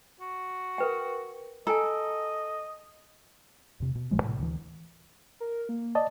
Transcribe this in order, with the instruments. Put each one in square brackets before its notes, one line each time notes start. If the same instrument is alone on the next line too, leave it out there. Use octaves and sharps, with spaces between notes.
[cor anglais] F#4
[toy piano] A#4 B4 G5
[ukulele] A4 [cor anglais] D#5 [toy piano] G#5 A#5
[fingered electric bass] E2 C3
B2
A1 A2 F3 G#3
A2 C3
D2 E3
[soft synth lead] A#4
A#3
[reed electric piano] D5 D#5 A5